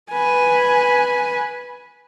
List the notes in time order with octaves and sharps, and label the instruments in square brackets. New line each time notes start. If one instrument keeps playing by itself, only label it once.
[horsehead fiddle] B4 G#5